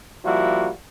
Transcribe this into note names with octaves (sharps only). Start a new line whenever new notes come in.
F3 G3 A#3 E4 F#4